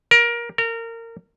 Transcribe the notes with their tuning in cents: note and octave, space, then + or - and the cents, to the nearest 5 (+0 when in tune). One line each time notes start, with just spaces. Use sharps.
A#4 +20
A#4 -25